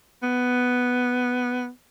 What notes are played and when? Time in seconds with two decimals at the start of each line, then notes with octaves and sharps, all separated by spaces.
0.23 B3